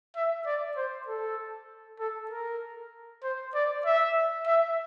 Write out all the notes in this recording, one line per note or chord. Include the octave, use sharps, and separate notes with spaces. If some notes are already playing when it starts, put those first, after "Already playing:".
E5
D5
C5
A4
A4
A#4
C5
D5
E5
E5